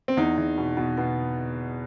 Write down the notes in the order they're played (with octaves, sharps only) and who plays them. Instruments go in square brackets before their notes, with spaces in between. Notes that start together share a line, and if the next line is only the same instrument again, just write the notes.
[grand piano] C4
E2 D#4
E2
B2
B2
B2 B3